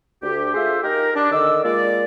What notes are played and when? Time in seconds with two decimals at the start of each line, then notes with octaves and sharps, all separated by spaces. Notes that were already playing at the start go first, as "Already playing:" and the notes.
0.22 D2 G4
0.54 A3 F4 G#4 C5 E5
0.82 D#4 G4 A#4
1.15 D4
1.31 D3 D#3 D#5 D6 E6
1.64 G#3 A#3 F4 D5